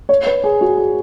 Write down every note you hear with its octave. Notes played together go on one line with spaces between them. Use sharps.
C#5
B4
G#4
F#4
G#4